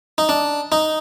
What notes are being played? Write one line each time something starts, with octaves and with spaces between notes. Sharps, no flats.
D#4
D4
D#4